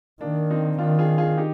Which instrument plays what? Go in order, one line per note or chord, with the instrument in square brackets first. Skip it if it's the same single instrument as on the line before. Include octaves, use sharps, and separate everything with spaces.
[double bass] D#3 [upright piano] A#3 D4
[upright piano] C4 D#4
[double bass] D#3 [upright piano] D4 F4
[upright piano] F4 G#4
F4 G#4
D#4 G4